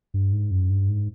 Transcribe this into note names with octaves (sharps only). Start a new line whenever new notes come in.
G2
G#2
F#2
G2
G#2